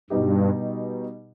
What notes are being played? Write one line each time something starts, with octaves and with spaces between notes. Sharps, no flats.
G2 B2 G3 B3 D#4 G4